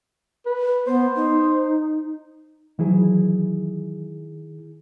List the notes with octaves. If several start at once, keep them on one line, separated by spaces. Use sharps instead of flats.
B4
B3 C5
D#4
D#3 E3 F#3 E4 G#4